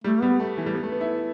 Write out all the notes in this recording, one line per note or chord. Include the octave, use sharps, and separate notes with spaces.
G3 A3
G3 B3
A3
E3
G3
B3
A3
B3
E4